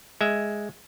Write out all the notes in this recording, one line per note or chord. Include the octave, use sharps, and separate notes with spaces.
G#3 E5